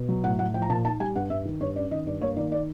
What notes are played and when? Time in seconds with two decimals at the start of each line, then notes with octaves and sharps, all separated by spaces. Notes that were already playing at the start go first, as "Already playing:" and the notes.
Already playing: B2
0.09 F#3
0.24 A2 F#5
0.39 A2 F#5
0.54 F3 G5
0.62 A#5
0.69 A#2 A5
0.85 D#4 A5
1.00 G3 G#5
1.15 G2 F#5
1.30 G2 E5
1.45 D#3
1.60 G2 C#5
1.76 C#4 D5
1.91 D#3 D#5
2.06 G2 D5
2.21 A#3 C#5
2.36 D#3 D5
2.52 D5